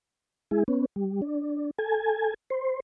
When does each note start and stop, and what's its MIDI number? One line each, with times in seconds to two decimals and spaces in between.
0.51 0.63 56
0.51 0.63 64
0.51 0.63 68
0.68 0.85 59
0.68 0.85 61
0.96 1.21 55
1.22 1.71 62
1.78 2.34 69
1.78 2.34 80
2.50 2.80 72